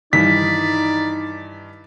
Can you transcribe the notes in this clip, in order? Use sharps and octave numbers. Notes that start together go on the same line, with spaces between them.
G2 D#3 E3 D#4 D5 B6